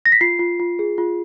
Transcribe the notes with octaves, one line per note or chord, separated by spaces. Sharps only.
A#6
B6
F4 C7
F4
F4
G#4
F4